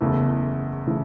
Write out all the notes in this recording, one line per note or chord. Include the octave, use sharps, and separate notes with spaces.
F#1 E2 C#3 E3 A3
C#3 E3 A3